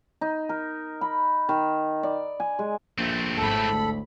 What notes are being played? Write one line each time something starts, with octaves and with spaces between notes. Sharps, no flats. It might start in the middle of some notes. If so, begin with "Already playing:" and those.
D#4
A#4
B5
D#3
D5
G#5
G#3
A#1 A3 C4
G#1 A2 A4 B5
D2